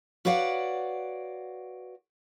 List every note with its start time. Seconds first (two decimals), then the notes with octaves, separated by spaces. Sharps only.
0.25 F#4 B4 C#5 D5 F5 F#5